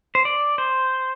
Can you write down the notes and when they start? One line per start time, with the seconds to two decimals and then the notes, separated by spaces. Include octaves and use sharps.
0.15 C5
0.25 D5
0.58 C5